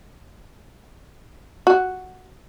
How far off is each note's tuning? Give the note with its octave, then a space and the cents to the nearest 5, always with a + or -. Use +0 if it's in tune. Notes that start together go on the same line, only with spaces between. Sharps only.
F#4 +0